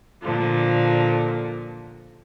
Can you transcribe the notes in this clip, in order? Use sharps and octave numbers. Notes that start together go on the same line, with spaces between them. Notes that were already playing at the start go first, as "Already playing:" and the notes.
A#2 D3 F3